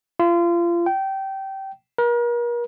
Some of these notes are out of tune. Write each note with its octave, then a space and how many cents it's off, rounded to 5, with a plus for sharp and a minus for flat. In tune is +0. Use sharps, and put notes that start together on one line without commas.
F4 -30
G5 -20
A#4 +40